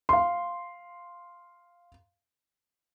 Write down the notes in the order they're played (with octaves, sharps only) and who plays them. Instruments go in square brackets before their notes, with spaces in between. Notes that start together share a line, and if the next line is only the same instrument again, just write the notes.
[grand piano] F5 C6